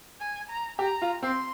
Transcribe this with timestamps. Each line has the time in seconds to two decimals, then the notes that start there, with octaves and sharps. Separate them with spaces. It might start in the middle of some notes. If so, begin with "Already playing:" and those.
0.20 G#5
0.49 A#5
0.79 G4 A#5
1.02 F4
1.22 C4 C6